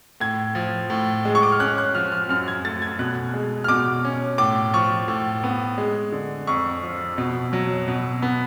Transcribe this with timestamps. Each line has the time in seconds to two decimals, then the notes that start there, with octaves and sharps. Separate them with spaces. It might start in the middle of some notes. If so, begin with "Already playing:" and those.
0.20 A2 G#6
0.55 F3
0.90 A2
1.25 G#3
1.35 C#6
1.43 D6
1.52 F6
1.60 C#4 F#6
1.78 F#6
1.95 F3 F6
2.12 F6
2.29 F#2 F6
2.48 G#6
2.65 A3 A6
2.82 G#6
2.99 B2 F#6
3.34 G#3
3.64 F6
3.68 B2 D6
4.05 C#4
4.38 A2 D6
4.73 F3 C#6
5.08 A2
5.44 B3
5.78 G#3
6.12 D3
6.47 F2 C#6
6.83 F3
7.18 B2
7.53 F#3
7.88 B2
8.22 B3